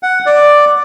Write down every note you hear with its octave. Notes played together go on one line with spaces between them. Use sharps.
F#5
D5